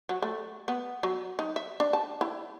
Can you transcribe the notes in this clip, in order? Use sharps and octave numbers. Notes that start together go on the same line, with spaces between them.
F#3
A3
B3
F#3
D#4
E5
D4
A5
E4